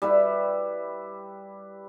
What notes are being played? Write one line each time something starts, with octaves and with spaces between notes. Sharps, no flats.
G3 E4 B4